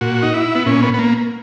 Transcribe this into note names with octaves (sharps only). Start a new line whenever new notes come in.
A#2 F#4
D#4
E4
B3
A#2 C#4
B3
B3
A#3